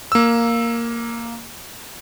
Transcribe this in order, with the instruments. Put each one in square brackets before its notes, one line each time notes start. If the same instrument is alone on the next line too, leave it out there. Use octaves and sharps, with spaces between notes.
[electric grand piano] A#3 E6